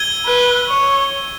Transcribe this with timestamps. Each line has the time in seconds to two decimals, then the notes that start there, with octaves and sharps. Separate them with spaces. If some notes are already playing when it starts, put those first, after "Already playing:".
Already playing: E6 G#6 D#7 G7
0.25 B4
0.68 C#5